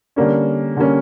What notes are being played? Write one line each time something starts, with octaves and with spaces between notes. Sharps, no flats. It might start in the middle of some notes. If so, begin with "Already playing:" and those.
D3 G3 A#3 C#4
D3 G3 A#3 C#4